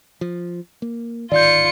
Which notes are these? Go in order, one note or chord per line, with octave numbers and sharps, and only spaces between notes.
F3
A#3
D1 G#1 D#3 F4 D5 G6 C#7